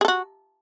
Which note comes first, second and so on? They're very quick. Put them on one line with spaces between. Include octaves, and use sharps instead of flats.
G#4 A4 F#4